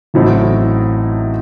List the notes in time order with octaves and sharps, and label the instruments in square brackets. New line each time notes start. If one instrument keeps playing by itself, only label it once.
[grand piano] A1 A2 F#3 C4 D#4